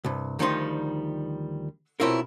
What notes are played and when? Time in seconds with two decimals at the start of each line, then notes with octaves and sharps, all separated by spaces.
0.04 C2 G2
0.39 D2 D#3 F3 G3 D#4 C6
2.00 B2 C4 C#4 E4 F4 A#4